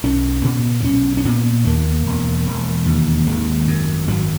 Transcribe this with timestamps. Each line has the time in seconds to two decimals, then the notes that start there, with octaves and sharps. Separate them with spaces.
0.04 B1 C#4
0.44 A#2
0.80 B3
0.84 B1 C#4
1.17 C#4
1.25 A#2 B3
1.65 D#2 A#3
2.06 E1
2.46 E1
2.86 D#2
3.27 G#1 G#3
3.67 F#2
4.07 G#1 F#3